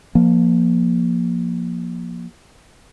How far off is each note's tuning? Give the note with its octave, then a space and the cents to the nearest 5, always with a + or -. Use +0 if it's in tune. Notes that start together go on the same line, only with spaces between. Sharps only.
F3 +0 A#3 +20